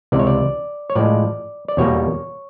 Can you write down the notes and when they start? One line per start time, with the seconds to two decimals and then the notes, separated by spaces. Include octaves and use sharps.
0.12 C#2 C3 E3 D5
0.19 C#5
0.27 D5
0.90 C#5
0.95 A2 F3 G#3 D5
1.68 D5
1.77 E2 B2 G3 A#3 C#5